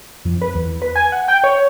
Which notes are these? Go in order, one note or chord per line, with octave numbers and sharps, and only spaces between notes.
F2
B4
E2
B4
G#5
F#5
G5
C#5